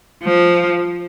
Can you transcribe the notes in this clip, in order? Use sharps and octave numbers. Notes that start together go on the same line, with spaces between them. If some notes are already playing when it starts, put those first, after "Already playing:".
F3